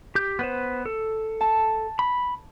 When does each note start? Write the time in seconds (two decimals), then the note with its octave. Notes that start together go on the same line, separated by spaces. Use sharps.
0.15 G4 G6
0.39 B3 B4 C5
0.86 A4
1.41 A5
1.99 B5